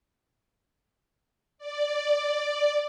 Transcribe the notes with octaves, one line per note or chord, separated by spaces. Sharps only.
D5